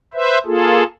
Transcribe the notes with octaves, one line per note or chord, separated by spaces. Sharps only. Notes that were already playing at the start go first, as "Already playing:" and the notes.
B4 C5 E5
A#3 F4 G#4 A4